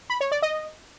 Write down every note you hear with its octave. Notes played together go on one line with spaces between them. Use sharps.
B5
C#5
D5
D#5